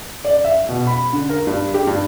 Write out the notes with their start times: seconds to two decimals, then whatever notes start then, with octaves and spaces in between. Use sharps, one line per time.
0.25 D5
0.44 E5
0.69 B2
0.87 B5
1.13 D3
1.29 A#4
1.47 G2
1.74 G4
1.87 G2